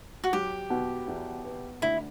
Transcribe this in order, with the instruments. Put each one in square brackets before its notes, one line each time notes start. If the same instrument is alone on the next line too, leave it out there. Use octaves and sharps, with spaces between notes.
[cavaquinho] F#4
[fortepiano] F#3 [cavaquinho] G4
[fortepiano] B2
E2
B3
[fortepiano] D2 [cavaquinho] E4